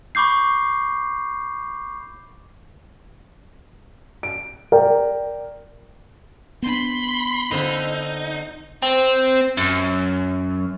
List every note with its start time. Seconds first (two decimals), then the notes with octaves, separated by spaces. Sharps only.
0.15 B5 C#6 D6 G6 C7
4.23 D7
4.72 A#4 D5 G5
6.62 B3 D4 B5 C6
7.51 D3 C4 D#4 F4
8.83 C4
9.58 F#2